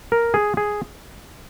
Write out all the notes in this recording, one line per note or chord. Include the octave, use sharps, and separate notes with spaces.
A#4
G#4
G#4